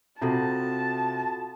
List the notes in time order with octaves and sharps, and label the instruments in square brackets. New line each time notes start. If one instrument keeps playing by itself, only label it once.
[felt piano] C3 [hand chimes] F4 F#4 A4 [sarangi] A5